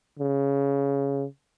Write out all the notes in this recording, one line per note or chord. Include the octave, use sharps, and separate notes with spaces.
C#3